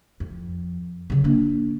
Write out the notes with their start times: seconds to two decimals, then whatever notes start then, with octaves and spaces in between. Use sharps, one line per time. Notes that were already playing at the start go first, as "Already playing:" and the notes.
0.20 F2
1.10 C#3 F#3
1.24 A#3 D4